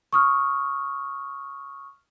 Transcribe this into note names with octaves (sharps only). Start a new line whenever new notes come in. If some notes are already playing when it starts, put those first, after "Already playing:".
C#6 D#6 F6